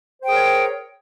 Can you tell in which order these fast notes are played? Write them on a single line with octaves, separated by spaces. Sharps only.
C5 G5 G#4 A#4 C#5